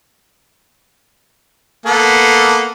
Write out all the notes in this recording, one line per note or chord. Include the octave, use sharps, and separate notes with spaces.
A#3 B3 A4